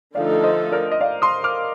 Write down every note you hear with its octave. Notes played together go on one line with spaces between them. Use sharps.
D3 F3 A3 D#4 A4 D5 F5
C5 D#5
A#4 D5
D#5
D5 F5
C6 D#6
D6 F6